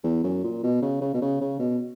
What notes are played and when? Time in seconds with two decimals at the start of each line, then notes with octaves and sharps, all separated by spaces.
0.04 E2
0.24 F#2
0.44 A#2
0.63 B2
0.82 C#3
1.01 C#3
1.14 B2
1.22 C#3
1.41 C#3
1.59 B2